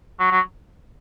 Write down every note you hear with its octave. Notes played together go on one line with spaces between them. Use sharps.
F#3
F#3